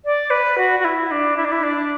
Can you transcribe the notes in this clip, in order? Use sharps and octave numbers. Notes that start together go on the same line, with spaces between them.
D5
B4
F#4
F#4
E4
D4
E4
D4
E4
D4